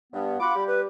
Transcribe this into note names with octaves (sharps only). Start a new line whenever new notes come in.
G2 B3
F4 F#5 B5 D6
G3 G4
B4